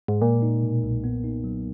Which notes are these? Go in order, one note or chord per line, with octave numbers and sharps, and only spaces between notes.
G#2
A#2 G#3
D#4
B2
B1
B3
D#4
F#3